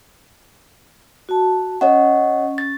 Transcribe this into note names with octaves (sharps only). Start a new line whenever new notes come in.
F#4 A5
C#4 C#5 D#5 F#5
A6